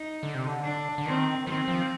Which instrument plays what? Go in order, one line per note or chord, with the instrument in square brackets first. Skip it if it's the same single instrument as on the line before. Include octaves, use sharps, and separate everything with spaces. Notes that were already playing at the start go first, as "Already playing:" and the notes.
Already playing: [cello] D#4
[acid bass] D3
C3
D3
[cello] D4
[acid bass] D3
[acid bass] D#3 [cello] C4
[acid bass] D#3 [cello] C4
[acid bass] F3